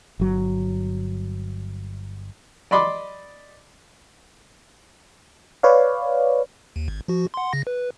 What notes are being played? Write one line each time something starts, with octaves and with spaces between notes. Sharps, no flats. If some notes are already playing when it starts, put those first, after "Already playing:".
G1 F#3
D5 D#5 B5 C6 D6
B4 C#5 D5 F5
D#2
G#1
F3 F#4
F#5 C6
C#3 A#6
B4